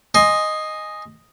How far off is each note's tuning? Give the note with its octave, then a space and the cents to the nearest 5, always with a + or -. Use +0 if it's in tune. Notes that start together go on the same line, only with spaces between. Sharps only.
D#5 +0 G#5 +0 C6 +15